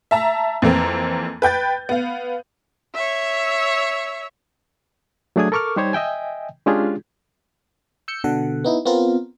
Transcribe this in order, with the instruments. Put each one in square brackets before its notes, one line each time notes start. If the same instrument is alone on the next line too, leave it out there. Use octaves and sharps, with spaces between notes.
[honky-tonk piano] E5 A5 A#5
F2 E3 A#3 C4
B4 G5 G6 A6
B3 F5
[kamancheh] C#5 E5
[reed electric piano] F#3 A3 D4 G#4 D#6 G#6
A4 A#4 C#6 D6 F6
G3 D#4 G4 C5 C#5 G#6
D#5 E5 G5 G#5
G#3 C#4 D4 F4 G4 G#4
[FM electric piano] E6 G6 C#7
B2 D3 A4 F#5
B3 D#4 E4
B3 C4 F4 A#4